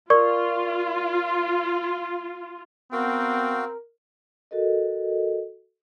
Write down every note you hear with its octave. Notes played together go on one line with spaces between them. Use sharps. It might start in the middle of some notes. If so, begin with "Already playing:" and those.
F4 A#4 D5 C#6
B3 C4 F#4 A#4 F5 G5
F#4 A4 A#4 D#5